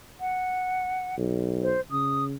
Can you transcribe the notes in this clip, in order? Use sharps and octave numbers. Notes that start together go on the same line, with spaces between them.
F#5
B1
C5
C#3 D#6